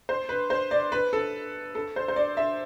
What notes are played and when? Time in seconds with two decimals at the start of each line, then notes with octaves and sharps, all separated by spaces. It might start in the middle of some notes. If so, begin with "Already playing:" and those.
0.09 C5
0.29 B4
0.50 C5
0.71 D5
0.92 B4
1.13 A4
1.75 A4
1.96 C5
2.08 C5
2.16 D5
2.37 E5